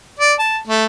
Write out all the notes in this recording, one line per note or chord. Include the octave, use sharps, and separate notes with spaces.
D5
A5
A3